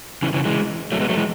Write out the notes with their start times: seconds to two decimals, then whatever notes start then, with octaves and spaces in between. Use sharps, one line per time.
0.22 C#3 E3
0.34 C#3 E3
0.45 E3 G#3
0.92 F#3 A3
1.00 G#3 B3
1.09 F#3 A3
1.17 E3 G#3